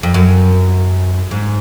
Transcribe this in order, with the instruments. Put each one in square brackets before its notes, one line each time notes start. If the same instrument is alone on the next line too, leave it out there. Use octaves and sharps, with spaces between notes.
[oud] F2
F#2
G#2